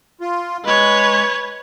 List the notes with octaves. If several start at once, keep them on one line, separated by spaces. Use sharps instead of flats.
F4
G#3 B4 C#5